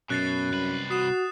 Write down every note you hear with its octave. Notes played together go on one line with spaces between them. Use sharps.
F#2 B2 F#6 A6 C7
C2 B4
F#4 D#6 C7 E7